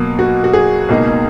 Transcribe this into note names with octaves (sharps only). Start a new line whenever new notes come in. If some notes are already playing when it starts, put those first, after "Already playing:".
Already playing: B2 F#3 A#3
F#4
F#4
G#4
C#2 B2 A#3 D#4